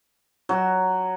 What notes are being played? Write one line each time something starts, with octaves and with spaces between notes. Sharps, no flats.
F#3